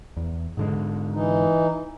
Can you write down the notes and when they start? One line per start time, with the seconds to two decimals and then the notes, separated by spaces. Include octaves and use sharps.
0.17 E2
0.57 G#2 D3 G#3
1.13 E3 D#4